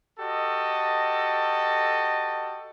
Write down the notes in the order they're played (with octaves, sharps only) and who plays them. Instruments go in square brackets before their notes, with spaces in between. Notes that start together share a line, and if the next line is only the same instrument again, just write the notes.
[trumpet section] F#4 G4 A4 D#5